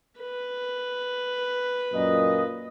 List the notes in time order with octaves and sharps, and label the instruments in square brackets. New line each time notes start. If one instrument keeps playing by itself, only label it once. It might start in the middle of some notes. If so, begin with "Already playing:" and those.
[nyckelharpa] B4
[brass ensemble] F#2 A#2 D#5